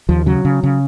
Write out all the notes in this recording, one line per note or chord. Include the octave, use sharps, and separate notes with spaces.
D#2 F3
C#3 F#3
C#3
C#3